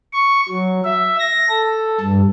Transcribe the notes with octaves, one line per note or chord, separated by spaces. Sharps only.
C#6
F#3
E5
A#6
A4
G2